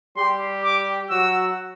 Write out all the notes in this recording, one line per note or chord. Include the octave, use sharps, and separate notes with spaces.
G3 G4 C6
D6
F#3 F#4 E6